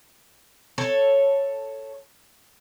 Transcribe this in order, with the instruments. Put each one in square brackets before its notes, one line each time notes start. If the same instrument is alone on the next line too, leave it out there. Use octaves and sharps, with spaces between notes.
[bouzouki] A4 C#5